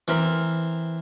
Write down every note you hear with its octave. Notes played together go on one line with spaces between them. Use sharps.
E3 C4 A#4 B5